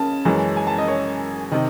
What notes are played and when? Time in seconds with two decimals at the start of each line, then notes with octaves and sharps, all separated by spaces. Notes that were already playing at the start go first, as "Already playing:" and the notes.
Already playing: C#3 A5
0.25 F#2 E3 G#3 C#4
0.57 G#5
0.67 A5
0.78 D#5
0.88 C#5
1.51 C3 D#3 D#5